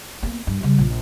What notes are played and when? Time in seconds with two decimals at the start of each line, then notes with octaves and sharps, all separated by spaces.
0.23 A#3 B3
0.47 G2
0.63 C#3 G3
0.78 A#1